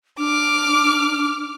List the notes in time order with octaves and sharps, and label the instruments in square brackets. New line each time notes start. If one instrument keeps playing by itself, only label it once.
[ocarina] D4 [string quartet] D6 F6